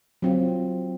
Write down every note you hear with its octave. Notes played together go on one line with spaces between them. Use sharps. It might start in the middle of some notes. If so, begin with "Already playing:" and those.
F#3 C4 F4